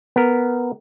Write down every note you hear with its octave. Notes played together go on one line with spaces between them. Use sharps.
B3 A#4